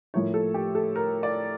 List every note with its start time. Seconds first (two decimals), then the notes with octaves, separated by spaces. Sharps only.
0.14 A2 F3 A#3 E4 C#5
0.34 A4
0.54 G4
0.75 A4
0.96 A#4
1.23 D5